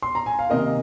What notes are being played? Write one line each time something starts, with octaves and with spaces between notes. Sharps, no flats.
C6
A#5
G#5
F5
C3 D#3 A#3 A#4 D#5